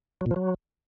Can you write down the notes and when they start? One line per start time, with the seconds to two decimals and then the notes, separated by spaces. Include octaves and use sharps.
0.21 F#3
0.26 A#2
0.31 F3
0.36 F#3